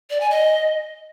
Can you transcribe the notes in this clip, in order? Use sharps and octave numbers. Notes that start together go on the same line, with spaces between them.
D5
G#5
D#5